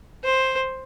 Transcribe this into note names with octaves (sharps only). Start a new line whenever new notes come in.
C5